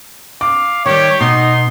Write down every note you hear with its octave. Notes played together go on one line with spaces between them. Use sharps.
F5 D6
D#3 G3 G4 C#5
B2 D#4 C6